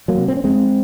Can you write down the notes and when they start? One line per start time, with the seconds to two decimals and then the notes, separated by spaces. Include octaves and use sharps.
0.08 F#3 A#3
0.18 C3
0.28 C4
0.37 C#4
0.44 F2 G#3 C4